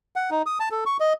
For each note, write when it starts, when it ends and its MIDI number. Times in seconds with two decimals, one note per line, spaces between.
0.16 0.30 78
0.31 0.42 63
0.46 0.58 87
0.60 0.69 81
0.71 0.84 69
0.86 0.97 85
1.00 1.13 75